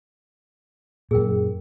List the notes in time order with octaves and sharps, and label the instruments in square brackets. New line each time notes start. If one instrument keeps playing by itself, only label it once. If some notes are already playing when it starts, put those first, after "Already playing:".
[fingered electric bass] F#2 A#2 [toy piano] G#4 A#4 G5